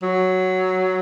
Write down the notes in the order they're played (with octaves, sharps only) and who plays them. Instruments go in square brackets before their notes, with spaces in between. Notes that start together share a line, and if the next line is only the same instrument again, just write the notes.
[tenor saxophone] F#3